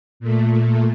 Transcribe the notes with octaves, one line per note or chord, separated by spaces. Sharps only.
A#2 A3